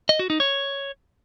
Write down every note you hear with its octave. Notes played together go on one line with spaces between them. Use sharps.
D#5
F#4
D#4
C#5